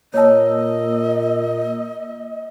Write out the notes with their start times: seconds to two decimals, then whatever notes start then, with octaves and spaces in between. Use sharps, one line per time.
0.14 A#2 A#3 C#5 D#5 A5 E6